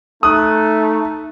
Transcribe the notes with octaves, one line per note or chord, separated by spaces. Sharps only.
A3 D#4 D#6 F#6